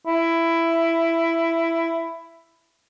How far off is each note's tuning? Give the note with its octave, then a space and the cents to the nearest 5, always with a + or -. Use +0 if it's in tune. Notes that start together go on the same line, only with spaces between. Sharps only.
E4 +10